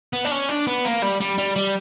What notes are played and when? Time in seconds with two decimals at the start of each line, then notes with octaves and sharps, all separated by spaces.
0.13 B3
0.25 D4
0.31 C#4
0.49 D4
0.67 B3
0.85 A#3
1.02 G3
1.20 G3
1.38 G3
1.56 G3